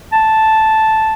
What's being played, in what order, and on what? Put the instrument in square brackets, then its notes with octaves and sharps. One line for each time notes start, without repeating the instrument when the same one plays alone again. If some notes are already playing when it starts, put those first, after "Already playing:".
[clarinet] A5